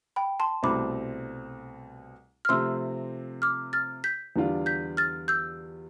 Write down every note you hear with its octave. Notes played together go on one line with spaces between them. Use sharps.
G5 B5
A5 C6
C2 B2 A3 C4 B5 D6
F6
C3 F3 A3 C4 C6 E6
D6 F6
F6 A6
G6 B6
E2 D3 G3 D4 F4
G6 B6
F6 A6
E6 G6